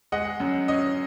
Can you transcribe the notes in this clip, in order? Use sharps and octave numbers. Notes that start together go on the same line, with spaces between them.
G#3 D#5 F#5
F#2
C#4 D#5